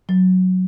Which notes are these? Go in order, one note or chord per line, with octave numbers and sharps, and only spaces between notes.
F#3